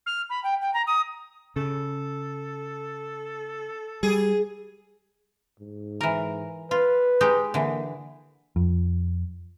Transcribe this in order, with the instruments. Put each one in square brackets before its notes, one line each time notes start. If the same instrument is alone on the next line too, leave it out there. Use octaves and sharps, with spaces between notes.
[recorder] F6
B5
G5
G5
A#5
D#6
[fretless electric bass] C#3 [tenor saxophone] A4
[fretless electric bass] G3 [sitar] G#4
[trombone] G#2
[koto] E3 A#4
[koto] F4 [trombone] B4
[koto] G#3 D#4 G4
[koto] D3 E3 [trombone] A#3
[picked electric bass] F2